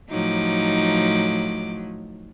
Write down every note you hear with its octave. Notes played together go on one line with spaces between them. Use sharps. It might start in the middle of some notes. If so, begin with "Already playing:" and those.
A2 F3 F#3 D#4 D6